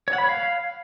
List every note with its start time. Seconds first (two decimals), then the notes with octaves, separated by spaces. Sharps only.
0.08 C#5
0.13 F#5
0.18 B5
0.24 C#5
0.29 F5